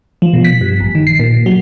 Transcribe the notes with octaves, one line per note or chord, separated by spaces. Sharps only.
F3
B2
B6
G2
A1
D#3
C7
A#2
F#3